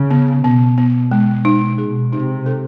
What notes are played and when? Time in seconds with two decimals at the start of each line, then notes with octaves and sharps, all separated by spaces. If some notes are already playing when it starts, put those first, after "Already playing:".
Already playing: C#3
0.11 B3
0.44 B2 B3
0.78 B3
1.11 G#3
1.45 D#4
1.78 B2 G#4
2.12 C3 D#4
2.46 A4